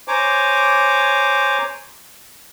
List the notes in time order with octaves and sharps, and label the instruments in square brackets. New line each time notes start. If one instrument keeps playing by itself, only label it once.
[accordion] C5 C#5 G#5 A#5 D6